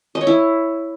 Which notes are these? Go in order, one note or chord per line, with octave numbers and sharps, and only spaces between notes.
D#5
C#5
E4